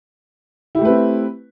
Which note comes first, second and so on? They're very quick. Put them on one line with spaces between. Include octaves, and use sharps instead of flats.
E4 G4 A3 B4 C4